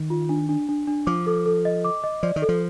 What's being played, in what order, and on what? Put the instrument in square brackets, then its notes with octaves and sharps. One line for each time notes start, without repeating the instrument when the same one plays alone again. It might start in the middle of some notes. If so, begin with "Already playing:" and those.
Already playing: [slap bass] D#3
[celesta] F4
D4
D4
D4
D4
[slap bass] F3 [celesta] D6
[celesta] A4
A4
D#5
D6
D#5
[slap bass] F3 [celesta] D5
[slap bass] D#3
[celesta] A4
[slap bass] F3